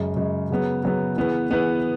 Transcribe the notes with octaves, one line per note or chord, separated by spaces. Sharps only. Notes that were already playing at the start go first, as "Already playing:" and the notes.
Already playing: F#2 C#3 G#3
F#2 C#3 G#3
C#3 F#3 B3
C#3 F#3 B3
E3 B3 G#4 B4
E3 B3 G#4 B4